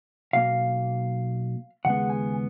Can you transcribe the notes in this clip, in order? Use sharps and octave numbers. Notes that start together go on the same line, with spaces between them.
B1 B2 A#3 F5
D#2 C#3 G#3 B3 F#5
G#5